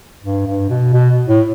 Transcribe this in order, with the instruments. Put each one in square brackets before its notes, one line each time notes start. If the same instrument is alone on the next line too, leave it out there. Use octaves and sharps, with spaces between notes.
[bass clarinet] G2
G2
B2
B2
A2